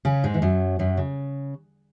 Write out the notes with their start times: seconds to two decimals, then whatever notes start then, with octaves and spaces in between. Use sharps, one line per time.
0.05 C#3 C#4
0.24 G#2 G#3
0.34 E3
0.42 F#2 F#3
0.79 F#2 F#3
0.97 C#3